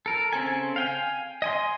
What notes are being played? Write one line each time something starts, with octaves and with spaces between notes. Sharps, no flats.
A4 A#4
C#3 C4 A4 G#5
F5 G5 G#5
D#5 G#5 C6